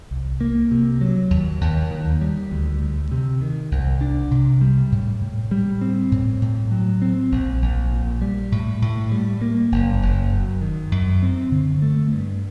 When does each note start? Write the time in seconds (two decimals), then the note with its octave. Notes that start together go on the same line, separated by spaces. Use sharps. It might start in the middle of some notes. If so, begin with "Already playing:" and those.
0.11 C2
0.41 A#3
0.71 C3
1.01 F#3
1.30 D#2
1.61 D#2
1.91 D#3
2.21 G3
2.51 D2
2.82 D2
3.11 C3
3.41 D#3
3.71 C2
4.01 D4
4.31 C3
4.61 G3
4.92 A2
5.21 A2
5.51 G3
5.81 C4
6.12 A2
6.41 A2
6.71 F#3
7.02 C4
7.32 A#1
7.62 A#1
7.92 A#2
8.22 G3
8.52 A2
8.82 A2
9.12 G3
9.41 A#3
9.72 F#1
10.02 F#1
10.32 F#2
10.62 D#3
10.92 F#2
11.22 C4
11.52 D3
11.82 A3
12.12 G2